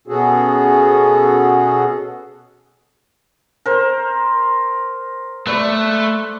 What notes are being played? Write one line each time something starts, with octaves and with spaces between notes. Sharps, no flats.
B2 B3 C#4 F#4 G#4 A4
A#4 C5
A3 B4 D5